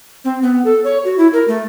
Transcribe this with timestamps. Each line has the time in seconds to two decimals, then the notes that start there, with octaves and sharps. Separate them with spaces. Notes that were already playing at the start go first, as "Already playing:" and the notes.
0.25 C4
0.42 B3
0.65 A4
0.84 C#5
1.05 F#4
1.18 E4
1.33 A#4
1.48 A3